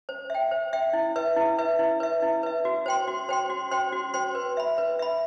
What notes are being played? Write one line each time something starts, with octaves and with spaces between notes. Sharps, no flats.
C5
E5 G5
C5
E5 G5
E4
B4 E5
E4
B4 E5
E4
B4 E5
E4
B4 E5
F#4
C5 G5 C6
F#4
C5 G5 C6
F#4
C5 G5 C6
F#4
C5 G5 C6
B4
E5 B5
B4
E5 B5